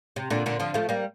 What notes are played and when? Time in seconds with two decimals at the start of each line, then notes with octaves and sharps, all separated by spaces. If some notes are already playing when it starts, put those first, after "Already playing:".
0.16 C3
0.30 A#2 D3
0.46 A#2 D3
0.60 D3 F3
0.74 F3 A3
0.89 G3 A#3